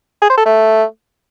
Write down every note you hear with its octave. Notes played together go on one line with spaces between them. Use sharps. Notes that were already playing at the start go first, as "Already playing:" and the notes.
G#4
C5
A4
A3